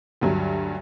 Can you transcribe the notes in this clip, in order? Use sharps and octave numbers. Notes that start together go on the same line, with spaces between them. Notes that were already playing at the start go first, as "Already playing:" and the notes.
D2 G2 F#3